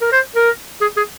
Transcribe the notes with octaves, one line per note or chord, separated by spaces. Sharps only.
A#4
C5
A#4
G#4
G#4